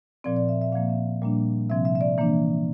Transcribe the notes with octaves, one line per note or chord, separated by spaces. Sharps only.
A#2 F3 C4 D5
D5
E5
E5
A#2 F3 A#3 F5
E5
A#2 G3 A#3 D4
C3 F3 C4 E5
E5
E5
D5
E3 A#3 D4